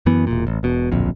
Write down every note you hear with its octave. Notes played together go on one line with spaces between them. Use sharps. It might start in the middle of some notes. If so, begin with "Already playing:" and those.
F#2 E3 B3
E1 A#2
A1
E1 B2
D1 A#1 F2